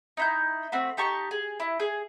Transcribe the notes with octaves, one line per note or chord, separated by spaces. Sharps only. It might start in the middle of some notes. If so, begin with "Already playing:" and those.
D#4 E4 G6
A3 C4 F#4 B5
D#4 G4 A5 C#6
G#4
E4
G#4